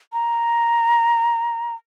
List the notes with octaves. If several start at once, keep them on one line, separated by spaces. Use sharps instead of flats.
A#5